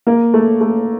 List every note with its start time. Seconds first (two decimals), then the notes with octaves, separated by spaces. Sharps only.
0.07 A#3
0.34 A3
0.61 A3